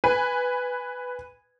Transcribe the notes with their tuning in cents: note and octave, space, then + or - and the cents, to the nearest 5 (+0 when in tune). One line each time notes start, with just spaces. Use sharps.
B4 +0 G#5 -10